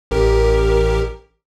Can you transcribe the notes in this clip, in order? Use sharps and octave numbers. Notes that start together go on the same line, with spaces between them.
A1 G4 A#4